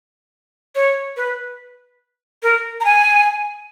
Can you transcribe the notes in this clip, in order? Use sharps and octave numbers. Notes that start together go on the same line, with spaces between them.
C#5
B4
A#4
A#5
G#5